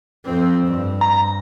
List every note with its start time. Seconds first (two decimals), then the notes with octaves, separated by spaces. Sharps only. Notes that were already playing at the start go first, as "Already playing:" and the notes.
0.25 F2 C4
0.66 G2
1.01 A#5